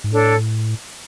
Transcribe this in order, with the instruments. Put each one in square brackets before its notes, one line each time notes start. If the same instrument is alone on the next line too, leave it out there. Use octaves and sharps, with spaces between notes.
[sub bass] G#2
[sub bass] A2 [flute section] D4 A4 C#5